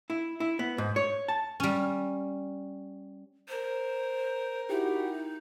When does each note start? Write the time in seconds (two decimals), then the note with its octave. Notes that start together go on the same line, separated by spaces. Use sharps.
0.10 E4
0.40 E4
0.59 B3
0.78 G#2
0.96 C#5
1.28 A5
1.60 G3 C#4
3.49 A#4 C5
4.69 D#4 E4 F#4 G4